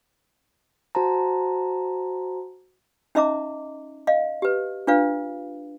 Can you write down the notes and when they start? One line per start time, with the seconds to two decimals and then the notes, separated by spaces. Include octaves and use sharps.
0.95 F#4 C5 A5 A#5
3.15 C#4 D#4 D#5 E5 A#5 D6
4.07 D#5 F5
4.42 G4 B4
4.87 D4 F4 B4 F5